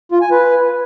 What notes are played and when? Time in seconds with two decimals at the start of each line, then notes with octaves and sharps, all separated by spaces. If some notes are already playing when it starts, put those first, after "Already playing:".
0.12 F4
0.21 G#5
0.31 B4